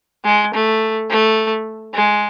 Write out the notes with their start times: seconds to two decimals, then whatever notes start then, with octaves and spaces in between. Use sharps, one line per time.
0.24 G#3
0.54 A3
1.10 A3
1.94 G#3